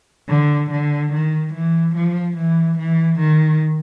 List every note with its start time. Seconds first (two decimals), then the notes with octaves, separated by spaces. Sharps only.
0.29 D3
0.71 D3
1.13 D#3
1.54 E3
1.95 F3
2.37 E3
2.79 E3
3.20 D#3